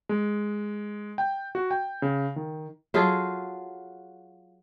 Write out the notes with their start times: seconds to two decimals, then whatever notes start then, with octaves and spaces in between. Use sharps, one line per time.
0.09 G#3
1.18 G5
1.55 F#4
1.71 G5
2.02 C#3
2.36 D#3
2.94 F#3 F4 G#4 A4